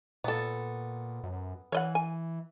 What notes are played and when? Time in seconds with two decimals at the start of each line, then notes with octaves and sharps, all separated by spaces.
0.24 A#2 B3 A4
1.23 F#2
1.72 E3 C#5 D#5 F#5
1.95 G#5